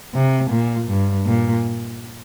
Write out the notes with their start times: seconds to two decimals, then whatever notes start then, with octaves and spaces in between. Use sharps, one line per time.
0.14 C3
0.50 A#2
0.88 G2
1.26 A#2